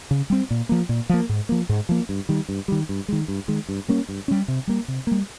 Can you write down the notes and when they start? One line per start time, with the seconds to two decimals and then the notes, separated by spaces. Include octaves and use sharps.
0.11 C#3
0.30 G3 C4
0.51 A#2
0.69 F3 A#3
0.89 A#2
1.09 F3 A#3
1.29 G#2
1.49 F3 A#3
1.69 G#2
1.89 F3 A#3
2.09 G2
2.29 D#3 G3
2.49 G2
2.68 D#3 G3
2.89 G2
3.08 D#3 G#3
3.28 G2
3.48 D#3 G#3
3.69 G2
3.88 G3 A#3 C#4
4.09 G2
4.28 G3 A#3 C#4
4.48 C3
4.67 G3 A#3
4.88 C3
5.07 G3 A#3